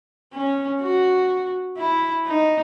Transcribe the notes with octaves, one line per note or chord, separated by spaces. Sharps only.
C#4
F#4
E4
D#4